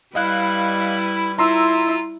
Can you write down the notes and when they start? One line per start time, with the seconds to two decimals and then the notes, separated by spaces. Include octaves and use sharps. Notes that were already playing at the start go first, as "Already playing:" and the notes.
0.15 G3 E4 B4 D#5 F5 F#6
1.39 E4 F4 A#5 C6 E6